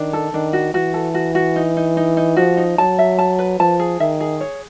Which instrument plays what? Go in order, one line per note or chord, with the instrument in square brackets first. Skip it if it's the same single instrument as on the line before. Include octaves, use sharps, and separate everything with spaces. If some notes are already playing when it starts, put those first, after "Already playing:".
Already playing: [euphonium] D#3 [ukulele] D4
[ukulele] A4
[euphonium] D#3 [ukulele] D4
[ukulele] F#4
[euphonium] E3 [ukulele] F#4
[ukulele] A4
F#4
F#4
D#4
D#4
D#4
D#4
[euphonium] F3 [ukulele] F#4
[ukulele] D#4
[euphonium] F#3 [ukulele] A5
[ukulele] E5
A5
B4
[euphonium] F3 [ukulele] A5
[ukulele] G#4
[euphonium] D#3 [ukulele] E5
[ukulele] G#4
C#5